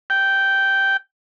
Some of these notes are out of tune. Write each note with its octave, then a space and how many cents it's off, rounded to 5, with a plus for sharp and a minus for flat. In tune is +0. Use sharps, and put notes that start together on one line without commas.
G5 -10